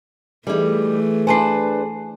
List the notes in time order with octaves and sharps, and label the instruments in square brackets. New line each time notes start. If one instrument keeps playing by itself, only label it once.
[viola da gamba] E3 A3 [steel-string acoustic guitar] G3 D#4 [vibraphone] G#4 A4
[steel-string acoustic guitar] D4 B4 C5 [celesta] G#5 A5 C7